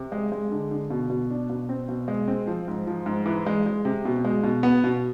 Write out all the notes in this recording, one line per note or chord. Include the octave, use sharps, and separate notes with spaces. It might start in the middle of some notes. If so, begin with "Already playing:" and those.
Already playing: C3
G#3
G#3
D3
D3
B2
B2
D4
B2
C4
B2
G#3
C4
F3
G#2
F3
G#2
E3
G#3
G#3
C3
B2
G#3
B2
B3
B2